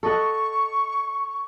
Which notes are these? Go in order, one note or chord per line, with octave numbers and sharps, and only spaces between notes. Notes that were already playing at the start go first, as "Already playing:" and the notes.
A4 D#5 F#5 C#6